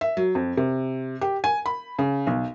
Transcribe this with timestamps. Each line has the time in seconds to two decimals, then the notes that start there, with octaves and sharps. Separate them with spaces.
0.01 E5
0.17 F#3
0.35 F2
0.57 C3
1.21 G4
1.44 G#5
1.66 B5
1.99 C#3
2.27 B1